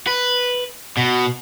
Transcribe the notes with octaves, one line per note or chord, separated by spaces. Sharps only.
B4
B2